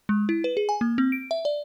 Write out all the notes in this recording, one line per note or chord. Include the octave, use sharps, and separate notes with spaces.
G#3
E4
B4
G#4
G#5
A#3
C4
D7
E5
D5